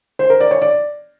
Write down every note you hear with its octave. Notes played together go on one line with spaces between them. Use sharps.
C5
A#4
D5
C#5
D5